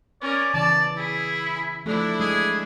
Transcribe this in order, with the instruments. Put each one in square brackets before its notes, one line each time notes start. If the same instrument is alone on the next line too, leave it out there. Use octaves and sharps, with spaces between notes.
[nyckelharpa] C#4 A#4 [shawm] D5
[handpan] C#3 E3 [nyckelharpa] D5 [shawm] A5
[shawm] E4 [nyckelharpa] G#4
[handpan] F3 A3 A4 [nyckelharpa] D4 E4
[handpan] G#3 [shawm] G#4